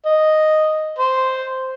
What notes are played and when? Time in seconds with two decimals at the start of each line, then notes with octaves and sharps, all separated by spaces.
0.06 D#5
0.99 C5